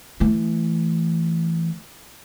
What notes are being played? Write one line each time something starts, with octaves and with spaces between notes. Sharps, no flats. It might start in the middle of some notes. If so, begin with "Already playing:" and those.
E3 A3